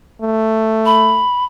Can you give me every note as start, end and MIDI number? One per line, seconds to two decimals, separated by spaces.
0.22 1.24 57
0.86 1.45 83